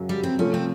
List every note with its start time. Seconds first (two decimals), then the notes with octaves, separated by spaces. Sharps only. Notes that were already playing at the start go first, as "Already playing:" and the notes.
Already playing: F#2 C#3 F#3
0.09 G3
0.23 C4
0.39 C3 F3 A3 C#4
0.54 C4